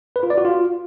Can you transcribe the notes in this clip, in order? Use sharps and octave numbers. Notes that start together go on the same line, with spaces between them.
B4
F4
D5
F#4
F4